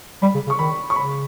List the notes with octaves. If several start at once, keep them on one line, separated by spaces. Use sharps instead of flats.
G3 B5
C#3
C#3
C#6
D#3 B5
C#6
C#3 B5